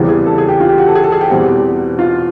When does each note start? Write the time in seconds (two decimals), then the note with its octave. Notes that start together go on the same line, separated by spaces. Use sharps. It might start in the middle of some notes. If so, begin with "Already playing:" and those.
Already playing: E2 C#3 E3 G3 C4
0.09 G#4
0.26 A4
0.38 G#4
0.48 G4
0.60 F4
0.69 G4
0.78 F#4
0.87 A4
0.95 G#4
1.04 A4
1.12 G#4
1.21 G4
1.30 E2 B2 G3 C4 F#4
1.99 F4